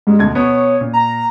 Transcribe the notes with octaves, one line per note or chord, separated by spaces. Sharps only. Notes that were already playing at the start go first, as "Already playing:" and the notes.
G#2 G3 G#3
D2 B2 G#6
B2 B3 C#5
A#2
A#5